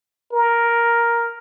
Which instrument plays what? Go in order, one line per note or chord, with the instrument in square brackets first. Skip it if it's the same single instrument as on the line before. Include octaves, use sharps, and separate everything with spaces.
[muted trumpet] A#4